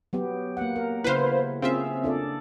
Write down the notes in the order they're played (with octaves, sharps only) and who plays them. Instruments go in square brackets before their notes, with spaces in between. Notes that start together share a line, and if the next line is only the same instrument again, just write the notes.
[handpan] F#3 B3 G4
A#3 F#5
A#4
[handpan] C#3 E4 [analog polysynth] B4 C5 F5
[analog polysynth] C4 F4 E5 [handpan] C#4 G#4 F5
[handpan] D4 A4 D5